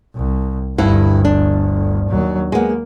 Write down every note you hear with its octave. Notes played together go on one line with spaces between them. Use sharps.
C2
G1 D2 G2 E4
D4
D#2 F#3
G#3 A#3 B3